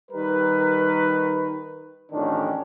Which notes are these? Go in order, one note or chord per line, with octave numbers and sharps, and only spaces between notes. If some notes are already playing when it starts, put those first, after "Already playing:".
D#3 G3 A#4 B4
A1 F2 D#3 C#4 D4